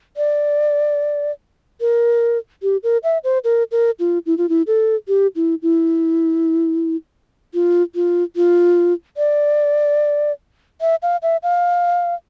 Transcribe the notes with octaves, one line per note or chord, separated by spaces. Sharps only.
D5
A#4
G4
A#4
E5
C5
A#4
A#4
F4
E4
F4
E4
A4
G4
E4
E4
F4
F4
F4
D5
E5
F5
E5
F5